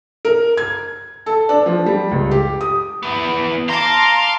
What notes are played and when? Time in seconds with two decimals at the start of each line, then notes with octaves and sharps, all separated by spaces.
0.25 A#4
0.57 G#6
1.26 A4
1.49 D4
1.66 F3
1.86 G3
2.11 C#2
2.31 G4
2.61 D#6
3.03 B3 E4
3.69 F5 A5 A#5 C6 D6